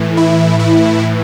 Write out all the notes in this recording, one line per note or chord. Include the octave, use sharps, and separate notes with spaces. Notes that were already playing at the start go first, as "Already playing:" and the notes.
Already playing: A2 E3
E4
E4